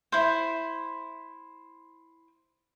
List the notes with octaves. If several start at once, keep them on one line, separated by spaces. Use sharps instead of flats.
E4 C5